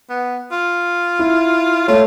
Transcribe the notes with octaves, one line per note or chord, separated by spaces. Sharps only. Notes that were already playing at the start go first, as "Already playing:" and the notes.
B3
F4
E4
A3 F4 C#5